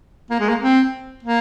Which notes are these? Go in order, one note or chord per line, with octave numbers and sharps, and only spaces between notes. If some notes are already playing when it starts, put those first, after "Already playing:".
A#3
G#3
A#3
C4
A#3